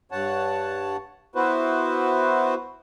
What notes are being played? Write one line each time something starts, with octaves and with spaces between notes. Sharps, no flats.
G2 C#5 F#5 A5
B3 E4 F#4 B4 C5